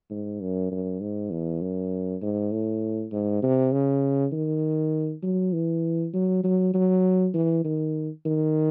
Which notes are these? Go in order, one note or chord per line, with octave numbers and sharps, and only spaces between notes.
G#2
F#2
F#2
G#2
E2
F#2
G#2
A2
G#2
C3
C#3
D#3
F#3
E3
F#3
F#3
F#3
E3
D#3
D#3